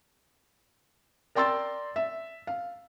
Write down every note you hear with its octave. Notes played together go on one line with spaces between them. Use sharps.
A#4 D5 G5 C6 E6 A6
E5
F5